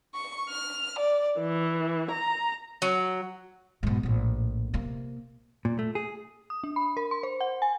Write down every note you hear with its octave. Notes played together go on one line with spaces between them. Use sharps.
C#6
F6
D5
E3
A#5
F#3
G#2 B2
A#1 A2
C3 A#3
A#2
A3
G#4
D#6
D4
B5
A#4
C6
C5
F#5
G#5